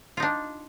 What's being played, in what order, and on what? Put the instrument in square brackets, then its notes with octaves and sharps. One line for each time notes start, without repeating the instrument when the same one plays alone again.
[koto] F4
D#4
D4